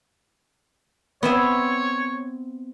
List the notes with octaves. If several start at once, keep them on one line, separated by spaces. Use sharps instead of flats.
B3 C4 C#5 E5